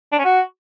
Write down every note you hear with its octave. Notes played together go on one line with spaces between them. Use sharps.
D4
C#4
F#4